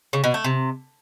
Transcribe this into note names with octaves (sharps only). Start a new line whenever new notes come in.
C#3
B2
A3
C3